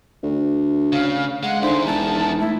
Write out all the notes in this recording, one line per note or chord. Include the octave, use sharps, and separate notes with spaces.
D2
C#3 F5
G#3 F5 F#5
D3 D#4 E4 G#4 C5
E1 A5
A3 E4